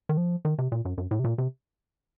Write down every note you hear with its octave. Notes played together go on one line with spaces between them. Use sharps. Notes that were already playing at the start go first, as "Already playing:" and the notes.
D#3
F3
D#3
C3
A#2
F#2
F#2
A2
C3
A#2
C3